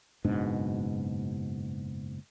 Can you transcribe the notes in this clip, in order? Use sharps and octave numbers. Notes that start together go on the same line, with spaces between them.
F#1 G#2 B2 D4